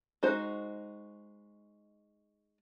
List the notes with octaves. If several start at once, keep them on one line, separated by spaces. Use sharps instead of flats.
G#3 D#4 F#4 C5